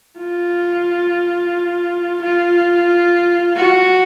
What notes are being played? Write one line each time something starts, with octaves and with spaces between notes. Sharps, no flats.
F4
F4
F#4